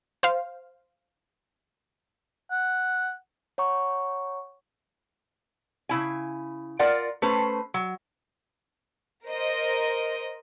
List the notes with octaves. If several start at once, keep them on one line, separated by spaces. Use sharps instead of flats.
C5 F5
F#5
C#5 F#5 A#5 C#6
C#3 E4 G#5
F4 A#4 D5 F#5
A3 C#4 B4 C5
F#3
A#4 C5 D#5